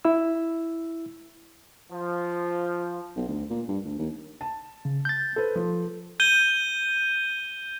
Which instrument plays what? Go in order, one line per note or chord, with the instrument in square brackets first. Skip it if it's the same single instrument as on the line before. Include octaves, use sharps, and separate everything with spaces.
[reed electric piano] E4 E6
[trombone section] F3
[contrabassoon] B1
D2
A#2
G2
D2
D#2
[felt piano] A5
[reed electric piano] C#3
G6 A6
[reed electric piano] A4 [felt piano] B4 C5
[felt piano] F3
[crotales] G6 D#7 G7